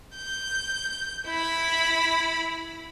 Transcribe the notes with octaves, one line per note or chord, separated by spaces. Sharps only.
G6
E4 B5